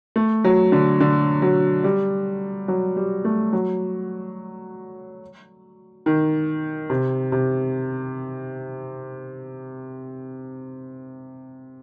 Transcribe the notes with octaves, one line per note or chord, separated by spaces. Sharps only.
A3
F#3
D3
D3
F#3
G3
F#3
G3
A3
F#3
D#3
C3
C3